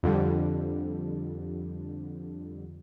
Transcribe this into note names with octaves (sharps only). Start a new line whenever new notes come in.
F2 D3 G3